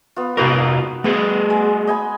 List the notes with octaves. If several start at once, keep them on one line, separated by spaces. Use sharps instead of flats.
B3 F4
C3 D#4 F4 F#4 A#4 B4
A3 B3 G#4 A4
G#3
D#5 G#5 B5